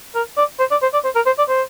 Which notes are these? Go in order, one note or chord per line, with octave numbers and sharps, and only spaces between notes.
A#4
D5
C5
D5
C5
D5
C5
A#4
C5
D5
C5